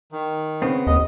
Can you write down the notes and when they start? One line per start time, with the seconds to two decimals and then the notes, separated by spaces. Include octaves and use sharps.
0.12 D#3
0.62 C#3 B3 C4
0.87 D#2 D#5